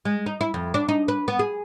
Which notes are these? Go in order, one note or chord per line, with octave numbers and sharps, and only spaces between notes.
G#3
D#4
E4
F2
D4
D#4
B4
B3
G#4